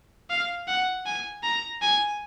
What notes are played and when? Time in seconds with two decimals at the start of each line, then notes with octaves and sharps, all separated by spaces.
0.30 F5
0.68 F#5
1.06 G#5
1.44 A#5
1.82 G#5